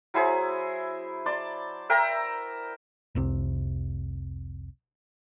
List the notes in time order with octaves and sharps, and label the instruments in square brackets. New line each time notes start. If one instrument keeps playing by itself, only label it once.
[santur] F#3 E4 G#4 C5
D5 A5 C6
A#4 E5 G5 A#5
[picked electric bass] F1 C2 C3